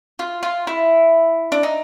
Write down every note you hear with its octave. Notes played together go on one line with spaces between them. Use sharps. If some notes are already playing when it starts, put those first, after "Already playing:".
F4
F4
E4
D4
D#4